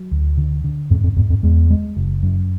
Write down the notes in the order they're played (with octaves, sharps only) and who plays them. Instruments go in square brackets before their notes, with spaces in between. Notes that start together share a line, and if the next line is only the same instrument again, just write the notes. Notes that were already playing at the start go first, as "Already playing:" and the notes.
Already playing: [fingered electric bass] F#3
D2
D3
D3
[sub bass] F2 [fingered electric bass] G#2
[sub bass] F2
[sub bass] E2 [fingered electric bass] G#2
[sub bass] F2
[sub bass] E2 [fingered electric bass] G#3
[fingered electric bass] G#3
F#1
F#2